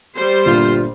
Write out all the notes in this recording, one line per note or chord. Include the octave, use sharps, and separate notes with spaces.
G3 C5
G1 A#2 D3 F4